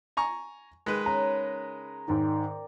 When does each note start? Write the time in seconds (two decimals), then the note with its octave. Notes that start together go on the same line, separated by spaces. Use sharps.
0.17 G#5 A#5 C#6
0.86 D#3 G#3 B4
1.06 C#3 A#5
2.08 G#2 D#3 A#4 D5 G5